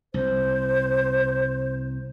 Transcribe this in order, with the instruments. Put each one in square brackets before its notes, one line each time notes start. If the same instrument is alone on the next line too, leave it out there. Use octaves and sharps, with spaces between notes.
[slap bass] C2 [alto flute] C5